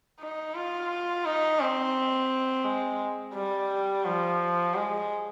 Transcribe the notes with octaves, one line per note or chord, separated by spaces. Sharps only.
D#4
F4
D#4
C4
G#3
G3
F3
G#3